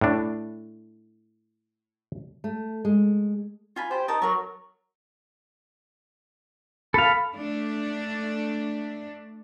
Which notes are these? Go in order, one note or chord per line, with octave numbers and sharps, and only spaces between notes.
A2 D4
A3
G#3
F4 G#5 B5
G4 C5
D#4 A#4 A5
F#3 A#4 C#6
A4 F5 B5
A3 D4